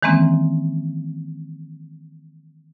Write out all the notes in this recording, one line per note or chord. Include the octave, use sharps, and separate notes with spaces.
D#3 E3 G#3 A#3 C4 C#4